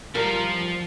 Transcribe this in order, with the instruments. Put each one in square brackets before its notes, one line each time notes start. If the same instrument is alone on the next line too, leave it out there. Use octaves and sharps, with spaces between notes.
[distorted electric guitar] F3 F5 [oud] G3 A#4